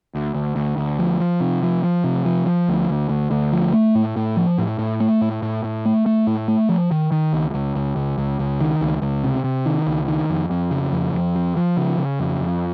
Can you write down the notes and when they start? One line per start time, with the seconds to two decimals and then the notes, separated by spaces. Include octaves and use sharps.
0.15 D2
0.35 D2
0.56 D2
0.77 D2
0.99 F3
1.20 F3
1.40 C3
1.63 F3
1.83 F3
2.04 C3
2.25 F3
2.46 F3
2.68 D2
2.90 D2
3.09 D2
3.31 D2
3.53 F3
3.73 A3
3.95 A2
4.16 A2
4.37 F3
4.58 A2
4.79 A2
5.00 A3
5.21 A2
5.42 A2
5.64 A2
5.85 A3
6.06 A3
6.27 A2
6.48 A3
6.69 F3
6.91 D#3
7.12 D#3
7.33 C#2
7.54 C#2
7.75 C#2
7.96 C#2
8.18 C#2
8.39 C#2
8.60 D#3
8.81 C#2
9.02 C#2
9.24 C3
9.44 C3
9.66 D#3
9.87 C#2
10.08 D#3
10.30 F2
10.51 F2
10.71 C#3
10.92 F2
11.13 F2
11.36 F3
11.57 F3
11.77 C#3
11.98 C#3
12.20 F2
12.40 F2